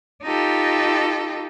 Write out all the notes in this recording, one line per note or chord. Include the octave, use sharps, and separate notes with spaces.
D#4 F4 G4 A4